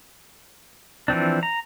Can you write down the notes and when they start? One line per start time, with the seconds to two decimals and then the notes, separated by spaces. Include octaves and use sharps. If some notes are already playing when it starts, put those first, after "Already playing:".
1.08 E3 F3 C4 D4
1.43 A#5